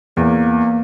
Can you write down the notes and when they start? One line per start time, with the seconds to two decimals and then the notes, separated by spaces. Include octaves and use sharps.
0.17 E2 A#3